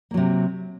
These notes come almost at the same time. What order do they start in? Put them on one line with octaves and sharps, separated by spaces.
A#3 F#3 C3